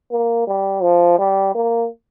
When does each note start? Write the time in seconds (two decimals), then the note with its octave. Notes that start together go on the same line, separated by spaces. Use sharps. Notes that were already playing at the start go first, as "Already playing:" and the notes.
0.11 A#3
0.47 G3
0.83 F3
1.18 G3
1.55 A#3